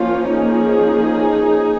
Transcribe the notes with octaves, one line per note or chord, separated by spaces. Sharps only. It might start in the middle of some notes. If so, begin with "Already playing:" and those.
Already playing: F3 A#3 C#4 F4
D#4 G#4